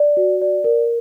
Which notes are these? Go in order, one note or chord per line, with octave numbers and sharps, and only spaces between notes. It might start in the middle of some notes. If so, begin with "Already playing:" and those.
Already playing: D5
F#4
D5
A#4